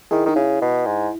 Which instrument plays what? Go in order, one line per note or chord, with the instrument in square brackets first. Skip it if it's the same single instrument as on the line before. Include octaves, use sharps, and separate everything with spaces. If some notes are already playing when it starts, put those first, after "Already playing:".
[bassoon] D#3 [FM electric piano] E4 G#4
[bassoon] D#3 [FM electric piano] D#4
[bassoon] C#3 [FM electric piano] E4
[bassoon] B2
G#2